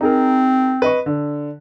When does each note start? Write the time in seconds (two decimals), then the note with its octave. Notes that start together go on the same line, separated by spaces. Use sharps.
0.01 C4 D#4 G#4 A#4
0.82 B4 D#5 C#6
1.06 D3